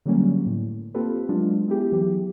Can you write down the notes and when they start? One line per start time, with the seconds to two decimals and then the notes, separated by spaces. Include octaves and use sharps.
0.06 D3 F#3 G3 A#3 C#4
0.46 A2
0.94 A#3 C4 F4 G4 A4 B4
1.29 F#3 G#3 D4 F4
1.68 B3 E4 G4 G#4
1.92 E3 F#3 G4